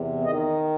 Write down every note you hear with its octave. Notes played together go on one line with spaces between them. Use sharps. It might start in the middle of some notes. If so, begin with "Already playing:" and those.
Already playing: E2 C3
D#3 D#5